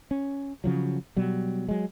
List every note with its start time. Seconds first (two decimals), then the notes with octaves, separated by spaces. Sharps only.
0.11 C#4
0.64 C#3 F3 F#3
1.16 B2 F#3 G3
1.68 F#3 G#3